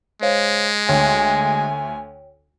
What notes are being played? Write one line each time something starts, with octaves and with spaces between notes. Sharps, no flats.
G#3 C5 C#5 F5
D2 C#5 G5 G#5